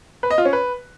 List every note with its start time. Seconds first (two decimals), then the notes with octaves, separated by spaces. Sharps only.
0.23 B4
0.30 D#5
0.38 F4
0.45 C#4
0.53 B4